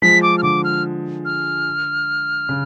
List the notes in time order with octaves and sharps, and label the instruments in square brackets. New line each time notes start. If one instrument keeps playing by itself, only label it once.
[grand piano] F3 G#3 [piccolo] B6
[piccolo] D6
F6
[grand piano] D3 [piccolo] D6
[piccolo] F6
F6
[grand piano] C#3